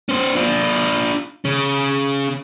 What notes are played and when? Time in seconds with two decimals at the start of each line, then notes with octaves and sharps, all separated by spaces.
0.09 C#4 C5
0.35 D4 F4
1.45 C#3 C#4